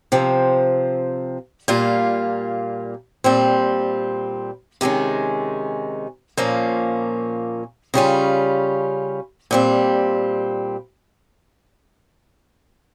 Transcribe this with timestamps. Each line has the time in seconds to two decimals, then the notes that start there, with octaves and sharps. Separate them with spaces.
0.12 C3 F3 C4
1.68 A#2 G3 A#3 F4
3.24 A#2 G3 C4
4.81 C3 D#3 G#3 C#4
6.37 A#2 F3 A#3 C#4
7.94 C#3 G3 C#4 F4
9.51 A#2 G3 C4